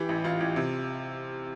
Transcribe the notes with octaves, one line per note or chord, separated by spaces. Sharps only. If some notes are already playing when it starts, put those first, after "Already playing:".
Already playing: E3 G4
A1
A1 F4
A1
C3